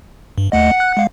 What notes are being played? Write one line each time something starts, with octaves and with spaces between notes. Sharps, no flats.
G2
D#2 A3 D#5 F#5
F#6
G#3 F5